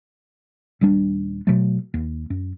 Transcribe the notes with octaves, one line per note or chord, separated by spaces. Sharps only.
D#1 G3 D4
B2 F#3 A3
D#2
F#2